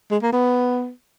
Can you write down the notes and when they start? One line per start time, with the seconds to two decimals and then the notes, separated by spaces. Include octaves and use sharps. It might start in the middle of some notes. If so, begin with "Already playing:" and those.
0.11 G#3
0.23 A#3
0.33 B3